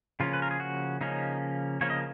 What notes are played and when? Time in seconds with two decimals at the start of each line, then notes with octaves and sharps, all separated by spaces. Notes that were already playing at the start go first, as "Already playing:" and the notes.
0.20 C#3 F3 A#3 C#4 F4
0.33 B4
0.42 A#4
0.51 G#4
0.60 F#4
1.01 C#3 F3 A#3 C#4 D#4
1.81 C#3 F3 A#3 C#4 C#5
1.90 D#5